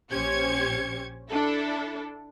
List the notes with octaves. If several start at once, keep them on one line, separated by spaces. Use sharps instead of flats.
A#1 C#4 G4 C5 G#6 C#7
D4 E4 A4